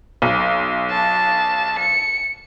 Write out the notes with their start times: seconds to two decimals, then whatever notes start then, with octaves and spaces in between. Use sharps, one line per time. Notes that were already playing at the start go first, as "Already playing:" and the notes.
0.22 B1
0.91 A5
1.79 C#7